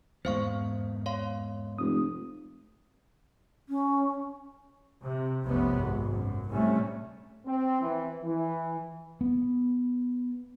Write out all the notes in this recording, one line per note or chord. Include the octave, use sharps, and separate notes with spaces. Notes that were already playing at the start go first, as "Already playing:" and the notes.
E2 G#2 G#3 A#3 B3 C5 F5 C#6
C#5 F5 C6
F1 D#6
C#4
C3
F1 B1 F#2 C3 B3 C#4
G#1
F#2
A2 C3 G3 A3 C#4
C4
E3
E3
B3